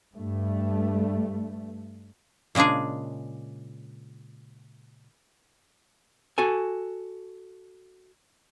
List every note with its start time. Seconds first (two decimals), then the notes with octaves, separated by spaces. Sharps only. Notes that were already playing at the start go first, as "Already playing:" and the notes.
0.15 G2 A3
2.55 A#2 C#3 G#3 D4 G#4
6.38 F#4 A4 G#5